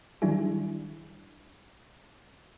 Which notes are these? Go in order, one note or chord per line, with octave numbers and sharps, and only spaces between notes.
D#3 F#3 G3 D4 E4 G#4